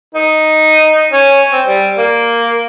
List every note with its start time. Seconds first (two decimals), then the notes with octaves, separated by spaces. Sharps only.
0.15 D#4
1.12 C#4
1.53 C4
1.67 G3
1.98 A#3